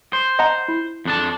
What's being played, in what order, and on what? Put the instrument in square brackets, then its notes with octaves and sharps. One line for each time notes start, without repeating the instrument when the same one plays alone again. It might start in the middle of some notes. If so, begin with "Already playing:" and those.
[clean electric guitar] C5
[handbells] D#5 F#5 A#5
E4
[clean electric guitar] F2 D4 A5